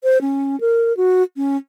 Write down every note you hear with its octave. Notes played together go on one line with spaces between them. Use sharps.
C5
C#4
A#4
F#4
C#4